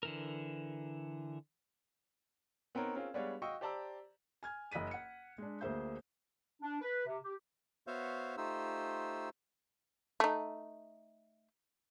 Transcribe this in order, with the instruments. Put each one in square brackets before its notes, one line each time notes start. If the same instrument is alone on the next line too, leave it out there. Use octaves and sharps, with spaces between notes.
[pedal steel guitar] D3 E3 A#4
[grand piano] B3 C4 D#4 A#4 C#5
C4 C#4 F4 G#4 A#4
G3 G#3 B3 D4 C#5 F5
F#4 D#5 F5 G5 C#6 E6
G4 C5 D5 A5 A#5 E6
[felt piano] G#5 F6 G#6
F#1 D#5 F#6 B6 D#7
F#5 C#7
G#3 D4
D2 A#3 G#4 C5 E5 G6
[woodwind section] D4
B4
C3
G4
[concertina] B3 F#4 C5 C#5 E5 F5
A3 D#4 F4 G4 C5 E6
[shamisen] A3 D#4